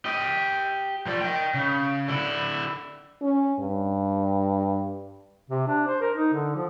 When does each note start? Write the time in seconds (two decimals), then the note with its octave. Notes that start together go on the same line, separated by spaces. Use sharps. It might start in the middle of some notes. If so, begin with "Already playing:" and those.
0.05 G4 D#5
1.06 F3 D5
1.21 D#5 G5
1.54 C#3
2.08 D3 E4
3.22 C#4
3.60 G2
5.50 C3
5.68 D4
5.87 C5
6.01 A#4
6.15 D#4
6.33 D3
6.55 F3